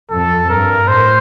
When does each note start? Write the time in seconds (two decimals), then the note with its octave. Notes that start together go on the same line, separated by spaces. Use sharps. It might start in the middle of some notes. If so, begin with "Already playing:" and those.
0.10 F2 A4
0.49 G2 A#4
0.88 A2 C5